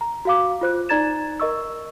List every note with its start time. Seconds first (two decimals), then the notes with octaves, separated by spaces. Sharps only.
0.01 A#5
0.25 F#4 F5 D6
0.61 F4 C5 F#6
0.89 D#4 D5 A#5 G#6 A6 E7
1.40 A#4 D#5 C#6 E6